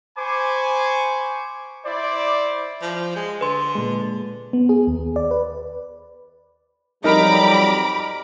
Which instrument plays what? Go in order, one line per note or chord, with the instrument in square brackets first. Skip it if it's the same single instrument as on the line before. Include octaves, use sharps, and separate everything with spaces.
[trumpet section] C5 G#5 B5 C#6 D6
E4 C5 D5
[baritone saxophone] F3
G#3
[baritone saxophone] D3 [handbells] B4 C6
[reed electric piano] A#2 G#3
[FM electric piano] B3
G#4
D#2
D5
B4
[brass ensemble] F2 F#3 G3 [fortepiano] D#4 A#4 [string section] A#5 B5 D6